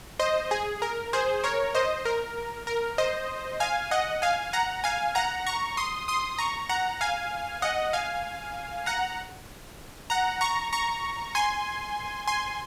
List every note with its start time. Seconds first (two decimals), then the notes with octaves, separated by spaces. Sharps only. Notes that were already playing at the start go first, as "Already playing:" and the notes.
0.20 C5 D#5
0.51 G#4
0.82 A#4
1.13 G#4 C5
1.44 A#4 C#5
1.75 C5 D#5
2.05 A#4
2.67 A#4
2.98 C5 D#5
3.60 F5 G#5
3.91 D#5 F#5
4.22 F5 G#5
4.53 F#5 A#5
4.84 F5 G#5
5.15 F#5 A#5
5.46 A#5 C#6
5.77 C6 D#6
6.08 C6 D#6
6.38 A#5 C#6
6.69 F#5 A#5
7.01 F5 G#5
7.62 D#5 F#5
7.93 F5 G#5
8.86 F#5 A#5
10.10 F#5 A#5
10.41 A#5 C#6
10.73 A#5 C#6
11.35 G#5 C6
12.27 G#5 C6